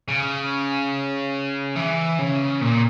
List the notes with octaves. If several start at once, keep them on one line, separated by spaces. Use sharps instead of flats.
C#3
E3
C#3
A#2